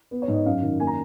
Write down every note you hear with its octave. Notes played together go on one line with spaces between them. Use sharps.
B3
C#5
G#2
D#5
F#2 F5
D#3
A#3 G#5
A#5